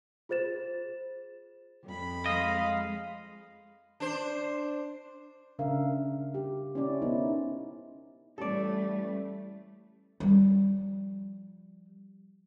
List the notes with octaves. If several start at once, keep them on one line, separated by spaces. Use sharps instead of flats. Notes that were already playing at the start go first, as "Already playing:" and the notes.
F4 G#4 C5 A6 E7
F2 B5
G#3 D#5 F5
D4 C5
C#3 D4 A#4 E5 F5
G4
C#4 E4 C#5 D5
B3 D#4 E4 A#4 C5
A1 G3 A3 A4 D5
F3 G3